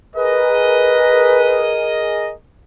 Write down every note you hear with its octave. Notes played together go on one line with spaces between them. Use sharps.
G#4 A#4 B4 D#5